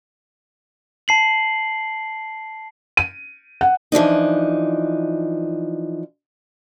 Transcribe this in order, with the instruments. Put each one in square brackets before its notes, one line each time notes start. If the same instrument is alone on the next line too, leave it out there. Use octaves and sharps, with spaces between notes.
[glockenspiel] A5 C7 F#7
[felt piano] D#7
F#5
[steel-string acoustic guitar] E3 F3 D4 D#4